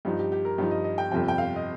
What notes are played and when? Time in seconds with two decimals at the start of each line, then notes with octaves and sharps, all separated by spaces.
0.05 G2 F3 D#4 G4
0.19 G4
0.32 G4
0.45 A#4
0.58 G2 F3 D#4 G4
0.71 D#5
0.84 D#5
0.98 G5
1.11 G1 F2 C3 F3 G5
1.28 G5
1.38 F5
1.56 D#5